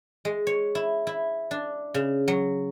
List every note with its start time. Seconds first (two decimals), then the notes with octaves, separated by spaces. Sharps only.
0.25 G#3
0.47 C#5
0.75 E4
1.07 E4
1.51 D4
1.94 C#3
2.28 F#3